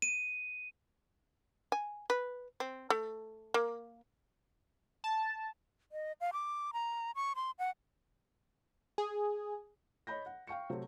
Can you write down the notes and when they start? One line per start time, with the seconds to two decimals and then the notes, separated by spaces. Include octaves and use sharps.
0.02 D#7
1.72 G#5
2.10 B4
2.60 C4
2.90 A3
3.54 A#3
5.04 A5
5.92 D#5
6.21 F5
6.33 D6
6.73 A#5
7.15 C#6
7.36 C6
7.59 F#5
8.98 G#4
10.07 C#5 D#5 B5 G6 A#6
10.26 F#5
10.47 F5 G5 C#6 C#7
10.70 C3 F#3 A3 C4